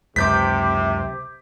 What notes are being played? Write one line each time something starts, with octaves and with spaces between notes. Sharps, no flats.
C#2 F#2 C3 D6 G6 B6